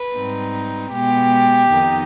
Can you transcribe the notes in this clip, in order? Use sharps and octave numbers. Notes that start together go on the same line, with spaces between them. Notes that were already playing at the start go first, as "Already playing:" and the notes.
Already playing: B4
G#2 G3 C4 D#4
B2 G#3 B3 G4
F2 D#3 B3 D#4